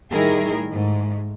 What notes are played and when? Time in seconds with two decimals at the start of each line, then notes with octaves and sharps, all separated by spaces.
0.11 A2 D#3 G3 E4 G#4 A#4
0.73 G#2 A3